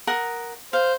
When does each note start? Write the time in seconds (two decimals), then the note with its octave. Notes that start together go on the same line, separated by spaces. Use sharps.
0.07 A#4 F#5 D#6
0.73 C5 F5